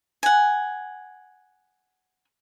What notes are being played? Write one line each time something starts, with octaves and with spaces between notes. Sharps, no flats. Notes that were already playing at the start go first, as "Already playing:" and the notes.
F#5 G#5